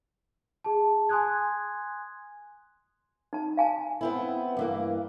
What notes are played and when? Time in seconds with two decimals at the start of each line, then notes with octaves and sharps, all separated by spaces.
0.64 G#4 A5
1.09 G#5 C6 D#6 F#6 G#6
3.33 D#4 A5
3.57 F5 G#5 A5
4.01 B3 C4 E4
4.57 G2 E3 A#3